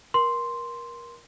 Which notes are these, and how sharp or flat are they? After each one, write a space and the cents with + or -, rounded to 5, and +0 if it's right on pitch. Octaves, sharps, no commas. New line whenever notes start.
A#4 +25 C6 +0